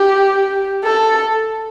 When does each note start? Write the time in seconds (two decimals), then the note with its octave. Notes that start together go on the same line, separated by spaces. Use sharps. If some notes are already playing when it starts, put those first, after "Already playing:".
Already playing: G4
0.84 A4